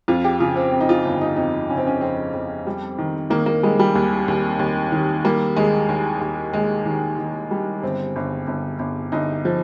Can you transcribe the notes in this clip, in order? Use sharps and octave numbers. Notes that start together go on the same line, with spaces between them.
F2 F4
G4
C#3 F4
C4
F2
D#4
F4
G1
D#4
F2 D#4
C#3 C#4
C4
C#4
F2 C4
F2
G3
D#3
D#3 A#3
A#3
G3 G#3
G3
D#2
D#2
D#2
D#3
G3 A#3
D#2 G#3
D#2
D#2
D#2 G#3
D#3
D#3
G3
G1 C4
G1
G1
G1
G1 D#4
F3